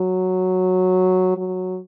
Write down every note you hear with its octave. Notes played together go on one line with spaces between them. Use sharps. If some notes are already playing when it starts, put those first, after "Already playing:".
Already playing: F#3
F#3